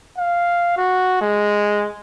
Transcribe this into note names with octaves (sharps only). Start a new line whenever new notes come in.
F5
F#4
G#3